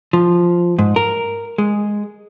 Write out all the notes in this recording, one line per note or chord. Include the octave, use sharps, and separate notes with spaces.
F3
G#2
A#4
G#3